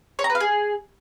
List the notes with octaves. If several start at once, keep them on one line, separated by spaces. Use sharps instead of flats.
C#5
A#5
B4
F5
G#4